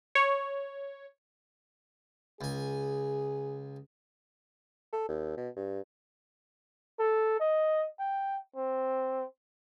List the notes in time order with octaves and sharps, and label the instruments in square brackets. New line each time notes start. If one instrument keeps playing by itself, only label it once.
[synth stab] C#5
[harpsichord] C#2 G#5 [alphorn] G#4
[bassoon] A4
D#2
B2
G2
[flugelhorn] A4
D#5
G5
C4